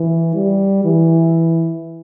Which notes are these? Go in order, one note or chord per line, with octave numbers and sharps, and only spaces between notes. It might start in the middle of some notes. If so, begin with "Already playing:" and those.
Already playing: E3
G3
E3